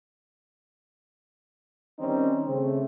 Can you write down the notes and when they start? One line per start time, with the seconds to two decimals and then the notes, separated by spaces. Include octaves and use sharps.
1.99 D#3 G3 C4 C#4 D#4
2.46 C#3 A3 C4